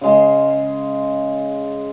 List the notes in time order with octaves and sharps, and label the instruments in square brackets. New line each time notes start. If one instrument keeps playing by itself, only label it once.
[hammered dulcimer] C#3 G#3 C6